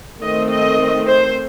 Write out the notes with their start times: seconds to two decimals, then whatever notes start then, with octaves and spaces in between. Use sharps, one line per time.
0.22 D#3 A3 C4 D#5
0.50 D#5
1.08 C5